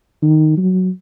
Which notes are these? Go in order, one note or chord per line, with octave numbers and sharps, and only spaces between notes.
D#3
F#3